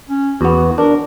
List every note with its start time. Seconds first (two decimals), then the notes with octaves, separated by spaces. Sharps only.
0.10 C#4
0.41 E2 B3 F#4
0.78 D4 A#4